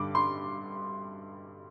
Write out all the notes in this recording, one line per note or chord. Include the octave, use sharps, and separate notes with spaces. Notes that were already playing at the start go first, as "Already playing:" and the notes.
Already playing: G2 D3 D6
C6